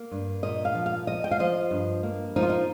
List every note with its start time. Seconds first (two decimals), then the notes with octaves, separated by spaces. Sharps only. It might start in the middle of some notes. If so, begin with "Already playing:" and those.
Already playing: A#3
0.11 G2
0.43 A#2 D#5
0.65 F5
0.75 F3
0.86 F5
1.07 F3 D#5
1.24 G5
1.31 F5
1.40 F3 D#5
1.71 G2
2.03 A#3
2.36 F3 D#4
2.42 F4
2.50 D#4